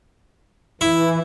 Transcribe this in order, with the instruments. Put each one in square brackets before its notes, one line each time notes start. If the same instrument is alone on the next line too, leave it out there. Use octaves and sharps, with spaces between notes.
[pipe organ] E3 [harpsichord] E4